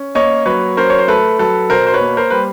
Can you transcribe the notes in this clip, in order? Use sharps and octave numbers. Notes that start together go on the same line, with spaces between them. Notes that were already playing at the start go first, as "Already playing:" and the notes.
Already playing: C#4
A#3 C#5 D#5
F#3 B4 C#5
C#4 A#4 C5
C#5
C5
A3 A4 B4
F#3 A4 B4
B2 A#4 C5
C5
B4 C#5
A#3
A#4 C5
G3 B4